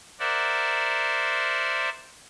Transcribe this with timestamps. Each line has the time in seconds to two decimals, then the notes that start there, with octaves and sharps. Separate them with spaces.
0.19 A#4 C5 D5 E5 F#5